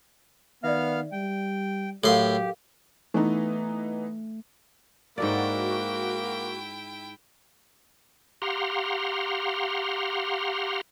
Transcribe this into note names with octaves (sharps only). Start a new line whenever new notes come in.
D#3 B3 D5 E5 F5 F6
G3 G5
A2 F#3 G4 A4 A#4 F5 C6
E3 A3 B3 D#4
G#2 A#3 E4 F#4 A4 D5 G5
G4 F5 F#5 A#5 C6